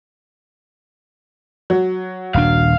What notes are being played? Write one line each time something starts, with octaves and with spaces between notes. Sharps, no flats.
F#3
D#1 D4 F5